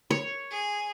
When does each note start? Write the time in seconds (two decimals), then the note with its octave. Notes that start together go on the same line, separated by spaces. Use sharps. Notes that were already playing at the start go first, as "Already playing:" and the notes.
0.11 C#5
0.51 G#4